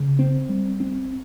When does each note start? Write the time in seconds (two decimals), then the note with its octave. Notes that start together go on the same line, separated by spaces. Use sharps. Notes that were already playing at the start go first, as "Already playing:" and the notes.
Already playing: C#3
0.19 C4
0.49 G3
0.80 C4